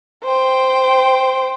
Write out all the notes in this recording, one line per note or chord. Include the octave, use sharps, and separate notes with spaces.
C5 G5